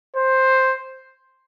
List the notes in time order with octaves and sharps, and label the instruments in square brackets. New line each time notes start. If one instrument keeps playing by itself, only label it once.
[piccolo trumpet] C5